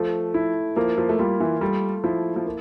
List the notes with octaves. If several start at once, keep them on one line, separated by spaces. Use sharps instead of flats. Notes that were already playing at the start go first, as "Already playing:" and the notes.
Already playing: F3 A3
E4
F3 A#3
F3
A3
G3 F4
E3
G3 A3
F3 E4
F3
A#3